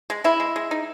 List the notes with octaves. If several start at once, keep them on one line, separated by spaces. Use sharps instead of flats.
G#3
G#3 E4
G#3
G#3
D#4